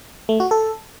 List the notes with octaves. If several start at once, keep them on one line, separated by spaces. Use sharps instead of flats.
A3
F#4
A4